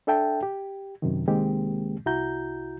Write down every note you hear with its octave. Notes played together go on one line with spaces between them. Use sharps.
D4 A4 E5 G5 A5
G4
F#2 C3 D#3
C2 D#3 G#3 A#3 C4 G4
C2 E4 F#4 A#5 G6